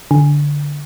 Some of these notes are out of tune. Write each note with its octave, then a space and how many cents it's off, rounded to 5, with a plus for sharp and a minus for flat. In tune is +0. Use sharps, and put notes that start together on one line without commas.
D3 -10